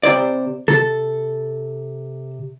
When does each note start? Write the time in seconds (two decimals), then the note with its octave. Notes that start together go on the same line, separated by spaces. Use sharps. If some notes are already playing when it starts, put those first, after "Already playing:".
0.03 C3 C5 D5
0.68 C3 A4